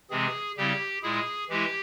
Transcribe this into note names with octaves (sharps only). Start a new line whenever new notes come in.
C3 E3 G#3 C4 G#4
C#3 G3 C4 E4 G4
A#2 G#3 E4 G#4
E3 G#3 E4 G4